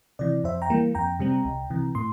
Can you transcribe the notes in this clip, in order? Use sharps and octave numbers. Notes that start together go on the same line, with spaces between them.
C3 E3 D5
F2 C5 E5
G5 A#5
E3 G3 A#3
F2 G5 A#5
C3 G3 C4
C2
C3 E3
A2 C6